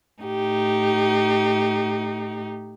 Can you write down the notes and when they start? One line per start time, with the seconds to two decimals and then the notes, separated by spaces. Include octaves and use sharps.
0.23 A2 D#4 G4